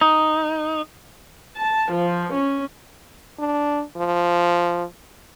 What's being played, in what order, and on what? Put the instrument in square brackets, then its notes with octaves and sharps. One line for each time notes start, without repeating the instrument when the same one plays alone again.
[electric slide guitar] D#4
[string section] A5
F3
C#4
[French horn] D4
F3